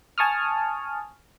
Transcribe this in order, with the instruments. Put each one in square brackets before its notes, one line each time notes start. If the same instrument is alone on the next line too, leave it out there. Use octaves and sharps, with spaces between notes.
[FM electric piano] G#5 A5 C#6 D#6 F6